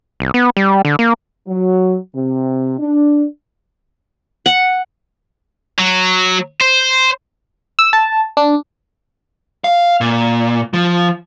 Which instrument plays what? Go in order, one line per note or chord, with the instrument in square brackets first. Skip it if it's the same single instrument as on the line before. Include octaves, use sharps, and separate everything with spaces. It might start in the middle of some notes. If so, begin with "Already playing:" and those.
[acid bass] C2
B3
G3
D3
A#3
[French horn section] F#3
C3
D4
[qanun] F#5
[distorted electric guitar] F#3
C5
[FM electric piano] E6
A5
D4
[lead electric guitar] F5
A#2
F3